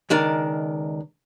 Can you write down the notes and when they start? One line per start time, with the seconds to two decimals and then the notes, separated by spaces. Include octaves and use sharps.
0.10 C#2 D#3 D4 A#4